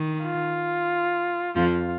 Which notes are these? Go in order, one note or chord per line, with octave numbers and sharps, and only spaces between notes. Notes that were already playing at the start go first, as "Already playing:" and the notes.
Already playing: D#3
F4
F2 F3 F4